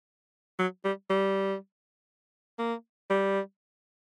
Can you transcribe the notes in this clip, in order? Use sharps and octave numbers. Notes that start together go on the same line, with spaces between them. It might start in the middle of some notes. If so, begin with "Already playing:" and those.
F#3
G3
G3
A#3
G3